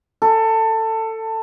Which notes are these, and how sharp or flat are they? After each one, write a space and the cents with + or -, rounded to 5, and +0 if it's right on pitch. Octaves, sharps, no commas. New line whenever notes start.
A4 +20